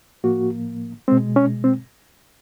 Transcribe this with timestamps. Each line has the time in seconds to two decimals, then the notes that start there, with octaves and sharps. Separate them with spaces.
0.24 A2 F3 A#3 F#4
1.08 B2 G#3 C4
1.36 C#4
1.64 C4